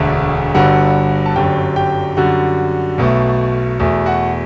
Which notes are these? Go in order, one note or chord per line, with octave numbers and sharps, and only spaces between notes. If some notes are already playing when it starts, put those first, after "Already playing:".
Already playing: E1 D2 D3 A3
G1 G2 D3 G3 F#4 F#5
A5
G1 F#2 D3 F#3 G4 G5
G4 G5
F#2 D3 G3 F#4 F#5
B1 B2 A3
E2 B2 A3
F#4 F#5